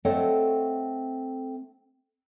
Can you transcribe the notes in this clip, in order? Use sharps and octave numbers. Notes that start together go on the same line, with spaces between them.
A3 C4 A4 C#5 D#5 F#5